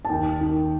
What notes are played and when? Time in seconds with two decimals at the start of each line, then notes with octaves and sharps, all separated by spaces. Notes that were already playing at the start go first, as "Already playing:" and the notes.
0.05 A5
0.09 D#2 G5
0.41 D#3